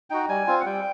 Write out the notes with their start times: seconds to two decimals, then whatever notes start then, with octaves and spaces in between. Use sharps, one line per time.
0.10 D#4 F#4 G5
0.29 G3 G#5
0.47 C4 F4
0.60 F#5
0.65 G3 G5